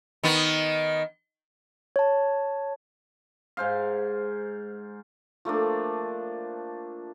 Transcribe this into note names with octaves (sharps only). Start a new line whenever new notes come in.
D#3 B3
C#5 A5
G#2 C5 F5
F3 A3 A#3 D4